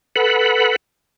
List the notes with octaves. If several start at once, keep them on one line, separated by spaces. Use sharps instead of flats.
A4 B4 F#5 B5